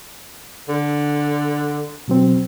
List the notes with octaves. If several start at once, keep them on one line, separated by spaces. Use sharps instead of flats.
D3
B2 F#3 C4